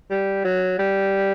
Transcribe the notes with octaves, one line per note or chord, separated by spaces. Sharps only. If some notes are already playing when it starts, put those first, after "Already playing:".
G3
F#3
G3